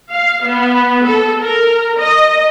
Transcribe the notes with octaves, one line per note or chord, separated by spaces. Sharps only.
F5
B3
A4
A#4
D#5